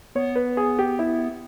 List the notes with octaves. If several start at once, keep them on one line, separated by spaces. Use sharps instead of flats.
B3 C#5
B4
G#4
G4
E4